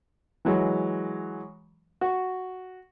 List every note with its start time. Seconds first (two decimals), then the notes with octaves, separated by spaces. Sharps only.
0.45 E3 F#3 G#3
2.01 F#4